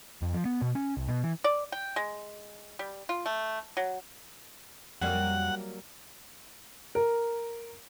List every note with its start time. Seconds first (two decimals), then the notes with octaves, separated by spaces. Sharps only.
0.22 F2
0.34 F3
0.45 B3
0.62 B2
0.75 C#4
0.97 C2
1.09 B2
1.23 E3
1.44 D5
1.72 G5
1.96 G#3
2.79 G3
3.09 F4
3.26 A3
3.77 F#3
5.01 F2 F#3 G3 A#3 F#5
6.95 A#4